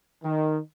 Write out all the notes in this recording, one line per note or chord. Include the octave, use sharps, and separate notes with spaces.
D#3